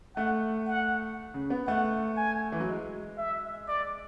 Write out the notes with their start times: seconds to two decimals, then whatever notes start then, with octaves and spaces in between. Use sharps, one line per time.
0.16 A3 F#5
0.67 F#5
1.34 C#3
1.50 B3
1.68 A3 F#5
2.17 G#5
2.52 E3
2.60 F#3
2.68 G#3
3.18 E5
3.68 D5